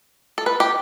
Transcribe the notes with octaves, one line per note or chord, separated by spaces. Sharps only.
A4
B4
G4